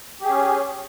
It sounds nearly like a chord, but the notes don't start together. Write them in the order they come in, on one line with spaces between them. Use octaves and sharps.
G4 G#4 C#4